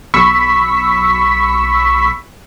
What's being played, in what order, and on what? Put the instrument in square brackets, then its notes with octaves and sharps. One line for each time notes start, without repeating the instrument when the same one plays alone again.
[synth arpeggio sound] B1 B5 C#6 E6 B6